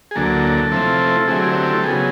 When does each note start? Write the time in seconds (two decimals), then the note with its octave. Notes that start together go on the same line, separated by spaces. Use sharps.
0.11 G#4
0.16 D2 D3 F#3 A#3 A4
0.71 C3 F3 A3 C4 E4
1.27 D3 F#3 A3 C4 E4 G#4
1.43 G4
1.73 A4
1.84 C#3 F#3 B3 G#4